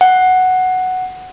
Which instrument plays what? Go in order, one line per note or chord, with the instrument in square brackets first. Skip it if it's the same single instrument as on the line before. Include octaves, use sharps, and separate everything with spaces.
[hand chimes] F#5